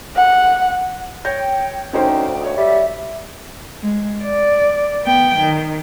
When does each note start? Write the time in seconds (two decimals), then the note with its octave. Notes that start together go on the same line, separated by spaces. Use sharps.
0.16 F#5
1.25 C#5 G5 G6 A#6
1.93 D2 C#4 D#4 C5 G5
2.41 C#5 D#5
2.57 G3 E5
3.82 G#3
4.24 D5
5.05 B3 G5
5.39 D#3